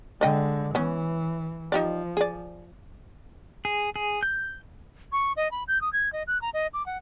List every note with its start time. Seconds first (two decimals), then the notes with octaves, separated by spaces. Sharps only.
0.21 D3 G#3 D5 D#5 G5
0.75 E3 B3 C#4
1.72 F3 D#4 G4 D5
2.17 G#4 D5
3.65 G#4
3.96 G#4
4.23 G6
5.12 C#6
5.36 D#5
5.51 B5
5.68 G6
5.81 D#6
5.93 G#6
6.13 D#5
6.27 F#6
6.42 A#5
6.54 D#5
6.74 D6
6.86 F#5